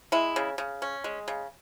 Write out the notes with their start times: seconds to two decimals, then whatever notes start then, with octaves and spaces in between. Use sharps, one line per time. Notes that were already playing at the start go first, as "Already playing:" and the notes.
0.12 G#3 E4
0.36 C#3
0.58 C#3
0.82 C#4
1.04 G#3
1.28 C#3